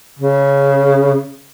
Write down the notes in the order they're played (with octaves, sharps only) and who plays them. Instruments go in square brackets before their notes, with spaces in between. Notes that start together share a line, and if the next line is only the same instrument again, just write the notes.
[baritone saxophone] C#3